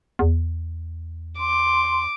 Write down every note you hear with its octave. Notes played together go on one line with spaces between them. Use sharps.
E2
C6 D6